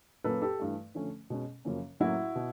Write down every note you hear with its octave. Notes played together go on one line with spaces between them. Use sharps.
A#2 F#3 A#3 C#4 A4 B4
G4 A4
G2 E3 A3
D3 F3 A3 C#4
B2 G#3 C#4
F#2 C#3 F3 A#3 C#4
A2 F#3 A#3 C#4 E4 F#4
B2